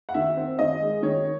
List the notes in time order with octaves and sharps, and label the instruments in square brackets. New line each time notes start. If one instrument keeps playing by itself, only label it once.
[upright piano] F#5
D#3 E5
C4
D#3 D#5
G#3
D#3 C#5